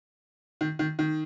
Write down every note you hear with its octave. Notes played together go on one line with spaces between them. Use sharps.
D#3
D#3
D#3